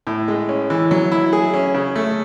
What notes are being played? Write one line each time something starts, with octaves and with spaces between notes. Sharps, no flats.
A2
G#3
C#4
E3
F#3
E4
G#4
C#4
C#3
A3